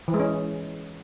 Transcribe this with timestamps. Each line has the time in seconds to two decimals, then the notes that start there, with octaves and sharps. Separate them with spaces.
0.08 E3
0.14 G#3
0.20 C#4